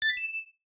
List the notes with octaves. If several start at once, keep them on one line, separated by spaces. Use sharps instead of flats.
A6
B6
E7